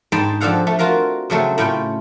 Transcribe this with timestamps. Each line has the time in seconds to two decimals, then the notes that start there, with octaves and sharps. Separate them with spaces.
0.12 G#2 G#4 G5 A5 B5 C6
0.41 F3 C4 D4 A4 F5 F#5
0.67 A3
0.79 F4 F#4 A#4 F5
1.30 C#3 F#3 A3 C4
1.58 A2 C#4 F4 G5 B5